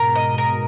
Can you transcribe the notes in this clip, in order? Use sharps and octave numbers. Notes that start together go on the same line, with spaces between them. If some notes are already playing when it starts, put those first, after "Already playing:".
Already playing: G#2 B2 A#4
D#5
A#4